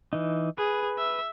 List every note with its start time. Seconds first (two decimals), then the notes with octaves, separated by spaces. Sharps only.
0.13 E3 D#4
0.58 G#4 B4
0.98 E5